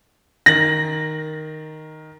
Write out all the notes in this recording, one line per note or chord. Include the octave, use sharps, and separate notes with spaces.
D#3 A6 A#6 F#7